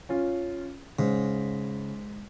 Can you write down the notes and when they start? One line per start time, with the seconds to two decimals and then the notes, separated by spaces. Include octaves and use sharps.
0.09 C#4 F4
0.99 G#2 C#3